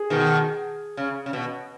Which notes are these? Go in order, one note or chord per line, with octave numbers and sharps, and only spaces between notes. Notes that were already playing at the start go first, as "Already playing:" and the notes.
Already playing: G#4
B2 D#3
C#3
C#3
B2